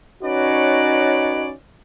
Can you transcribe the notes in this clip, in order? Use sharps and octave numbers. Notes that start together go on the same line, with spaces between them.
C#4 D#4 F#4 B4 C#5 D5